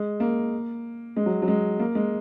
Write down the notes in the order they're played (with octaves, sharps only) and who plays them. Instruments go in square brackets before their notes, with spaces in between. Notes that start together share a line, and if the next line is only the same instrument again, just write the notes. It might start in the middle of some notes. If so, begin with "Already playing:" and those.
Already playing: [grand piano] G#3
A#3
G#3
F#3
F#3
G#3
A#3
G#3